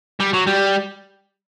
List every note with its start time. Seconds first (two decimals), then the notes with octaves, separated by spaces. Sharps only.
0.20 G3
0.33 F#3
0.46 G3